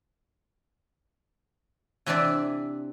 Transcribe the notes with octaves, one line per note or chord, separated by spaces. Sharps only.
C3 E3 C4 D4 D5 E5